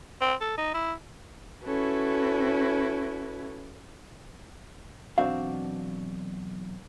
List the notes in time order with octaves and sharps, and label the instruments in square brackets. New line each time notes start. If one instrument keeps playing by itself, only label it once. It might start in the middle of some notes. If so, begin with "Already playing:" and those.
[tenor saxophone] C4
A4
D#4
E4
[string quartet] C#4 E4 F#4 A4 B4
[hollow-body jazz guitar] B1 E2 C4 D4 F#4 F5